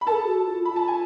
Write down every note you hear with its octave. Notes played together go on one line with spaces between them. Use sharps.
B5
A4 A#4 A5
G#4
F#4
F4
F4 B5
A5
G#5